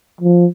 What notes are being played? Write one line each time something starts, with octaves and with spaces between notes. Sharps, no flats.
F3